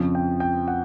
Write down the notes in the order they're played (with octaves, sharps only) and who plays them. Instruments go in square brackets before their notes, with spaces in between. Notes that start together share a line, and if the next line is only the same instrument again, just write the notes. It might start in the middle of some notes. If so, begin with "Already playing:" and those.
Already playing: [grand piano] F2 C#3 F3
G5
G5
F#5